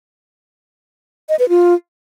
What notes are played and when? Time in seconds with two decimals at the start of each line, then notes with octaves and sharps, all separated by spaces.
1.29 D#5
1.39 B4
1.49 F4